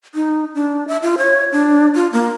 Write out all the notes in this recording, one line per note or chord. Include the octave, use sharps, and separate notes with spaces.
D#4
D4
E5
F4
C#5
D4
F4
A#3